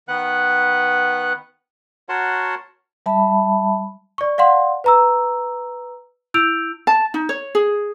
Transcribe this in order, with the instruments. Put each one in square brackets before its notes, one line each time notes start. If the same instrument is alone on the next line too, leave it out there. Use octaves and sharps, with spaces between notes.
[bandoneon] D#3 B3 B4 F#5 F#6
F#4 A#4 C#5 F#5 A5 C6
[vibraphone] G3 E5 A5 B5
[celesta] D5 C#6
D5 F5 F#5 C6
B4 A#5 E6
E4 E6 G6 D7 F7
[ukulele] A5
D#4
C#5
G#4